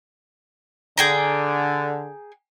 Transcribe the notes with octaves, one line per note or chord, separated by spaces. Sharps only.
D3 G#4 G5 A#5